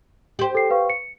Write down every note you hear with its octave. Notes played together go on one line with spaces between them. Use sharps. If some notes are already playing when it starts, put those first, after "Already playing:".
G4 C5
A4 C7
B4 F5 C#6
C#7